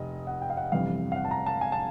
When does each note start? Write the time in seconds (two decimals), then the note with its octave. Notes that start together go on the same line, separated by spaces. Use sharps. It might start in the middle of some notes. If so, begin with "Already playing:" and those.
Already playing: F1 D#5
0.27 F#5
0.42 G5
0.50 F5
0.57 F#5
0.72 G1 F2 C3 E3 F5
1.12 F5
1.16 F#5
1.25 A5
1.31 A#5
1.46 A5
1.61 G#5
1.72 A5